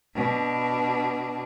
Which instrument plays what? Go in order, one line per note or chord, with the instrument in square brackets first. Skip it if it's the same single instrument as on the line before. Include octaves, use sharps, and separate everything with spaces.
[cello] B2 D4